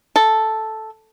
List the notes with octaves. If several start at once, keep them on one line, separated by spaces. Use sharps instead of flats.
A4